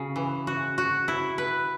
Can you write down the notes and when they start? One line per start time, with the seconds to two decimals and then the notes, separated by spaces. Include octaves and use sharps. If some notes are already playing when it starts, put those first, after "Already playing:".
Already playing: C#3 F#4
0.16 E3
0.47 F#4
0.78 F#4
1.08 E4
1.38 B4